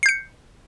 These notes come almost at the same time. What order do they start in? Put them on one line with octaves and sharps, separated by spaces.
C7 G6 C#7